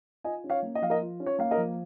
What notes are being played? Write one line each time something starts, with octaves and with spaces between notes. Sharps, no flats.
F4 D#5 G#5
C#4
C#5 F5
A#3
D#5
F3 F5
A#4 D#5
F4
C#4
C#5
A#3 F5
A#4 D#5
F3